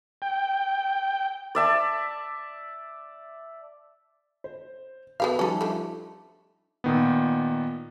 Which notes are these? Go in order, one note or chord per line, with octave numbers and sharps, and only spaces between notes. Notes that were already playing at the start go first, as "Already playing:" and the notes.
G5
D5 E5 A5
C5
B3 F#4 G4 A4 B4 F5
F3 G3 C#4 D#4 A4
D3 A3
A#2 D#3 B3